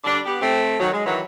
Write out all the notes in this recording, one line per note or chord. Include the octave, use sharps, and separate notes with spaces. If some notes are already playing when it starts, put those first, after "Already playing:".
D3 G3 D4
B3 G4
A3 C4
D#3 F#3
G#3
D#3 E3 F#3